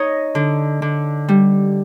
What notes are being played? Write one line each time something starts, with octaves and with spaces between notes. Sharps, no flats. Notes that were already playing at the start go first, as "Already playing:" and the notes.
Already playing: D#4 C#5 D#5
D3
D3
G3